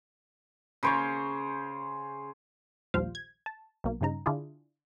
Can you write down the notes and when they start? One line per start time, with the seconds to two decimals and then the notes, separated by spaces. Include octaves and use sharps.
0.83 C#3 C5 C#5
2.94 A#1 D#2 F3 G3 C5 F5
3.15 G#6
3.46 A5
3.84 B1 B2 A#3
4.01 G2 C#3 D#4 A#5
4.26 D3 D4 E4 F4 G#4